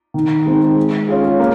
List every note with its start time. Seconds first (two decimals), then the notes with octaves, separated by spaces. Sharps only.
0.14 D#3
0.46 G#3 C4 D#4
0.76 G#3
1.09 C#4 F4 G#4
1.40 A#3